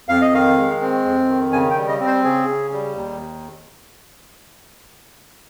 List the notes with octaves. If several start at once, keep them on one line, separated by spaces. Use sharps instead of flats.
F2 F5
D#5
D#3 F5
G#3
C4
F2
D#3
C#3 G#5
G5
G3
D#5
C4
C5
C#3 G#4
C#3
G3
D#2